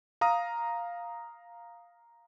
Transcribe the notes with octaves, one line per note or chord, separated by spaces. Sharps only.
F5 A#5 D#6